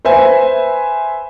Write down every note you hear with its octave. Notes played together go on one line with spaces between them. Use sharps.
B4 C5 E5 G#5